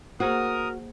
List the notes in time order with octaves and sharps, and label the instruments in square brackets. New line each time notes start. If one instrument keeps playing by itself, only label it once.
[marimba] A#3 G#4 C5 [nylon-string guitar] F#4 [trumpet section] A#4 [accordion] D#6